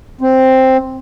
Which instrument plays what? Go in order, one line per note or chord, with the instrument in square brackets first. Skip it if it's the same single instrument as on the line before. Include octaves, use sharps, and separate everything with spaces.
[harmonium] C4